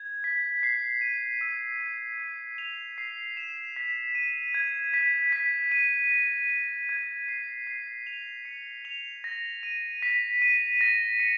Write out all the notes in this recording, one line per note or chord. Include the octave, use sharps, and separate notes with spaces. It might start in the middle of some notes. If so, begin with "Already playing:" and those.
Already playing: G#6
B6
C7
D#7
E6
G#6
C7
F7
C7
E7
B6
D#7
G#6
B6
B6
D#7
A#6
D#7
G#6
C7
C7
F7
C#7
F7
A#6
D#7
B6
D#7
A#6
C#7